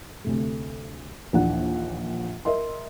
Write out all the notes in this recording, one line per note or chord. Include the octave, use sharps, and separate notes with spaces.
D2 C3 A3
A#1 D#2 E3 D4 F#5
A#4 D#5 E5 C6